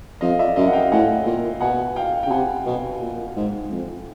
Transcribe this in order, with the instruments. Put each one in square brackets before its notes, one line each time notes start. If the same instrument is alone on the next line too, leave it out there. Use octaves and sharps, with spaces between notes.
[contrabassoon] F2 [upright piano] D#5 F5
[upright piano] D5 E5
[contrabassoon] F#2 [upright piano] D#5 F5
[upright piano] F#5
F5 G5
[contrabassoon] A2 [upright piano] F#5 G#5
[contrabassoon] A#2
[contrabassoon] B2 [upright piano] F#5 G#5
[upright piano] F5 G5
[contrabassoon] C#3 [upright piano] G5
[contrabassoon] C3 [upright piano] F#5 G#5
[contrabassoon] B2
A#2
G#2
F2